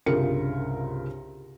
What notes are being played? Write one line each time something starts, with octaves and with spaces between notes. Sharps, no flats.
C2 G2 C#3 F4 A#4 C#7